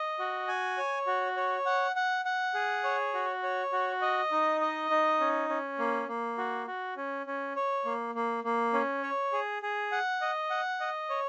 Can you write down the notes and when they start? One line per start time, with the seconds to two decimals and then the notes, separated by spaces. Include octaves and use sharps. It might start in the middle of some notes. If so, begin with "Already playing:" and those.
Already playing: D#5
0.19 F#4
0.48 G#5
0.77 C#5
1.07 F#4
1.37 C#5
1.66 F#5
1.96 F#5
2.25 F#5
2.54 G#4
2.84 C#5
3.14 F#4
3.43 C#5
3.73 F#4
4.01 D#5
4.31 D#4
4.61 D#5
4.90 D#4
5.20 C#4
5.49 C#4
5.79 A#3
6.08 A#3
6.38 F#4
6.67 F#4
6.97 C#4
7.26 C#4
7.56 C#5
7.85 A#3
8.15 A#3
8.44 A#3
8.73 C#4
9.03 C#5
9.33 G#4
9.62 G#4
9.92 F#5
10.21 D#5
10.50 F#5
10.80 D#5
11.10 C#5